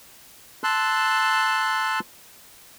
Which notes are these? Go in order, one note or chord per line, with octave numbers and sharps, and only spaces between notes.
A5 C6 E6 F#6